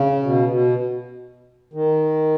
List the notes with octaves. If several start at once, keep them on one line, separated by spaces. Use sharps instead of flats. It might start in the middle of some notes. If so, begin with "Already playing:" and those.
Already playing: C#3
B2
B2
D#3